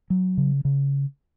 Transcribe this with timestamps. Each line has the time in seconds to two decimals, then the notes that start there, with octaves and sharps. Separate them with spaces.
0.10 F#3
0.37 C#3
0.65 C#3